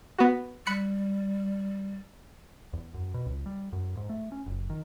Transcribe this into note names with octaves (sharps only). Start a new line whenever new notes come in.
B3 F#4
G3 B5 F#6 C#7
E2
F#2
B2
C#2
G3
F#2
G#2
A3
C#4
F#1
D#3